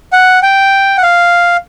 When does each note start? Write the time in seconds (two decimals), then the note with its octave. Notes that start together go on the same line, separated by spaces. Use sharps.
0.13 F#5
0.43 G5
0.98 F#5
1.03 F5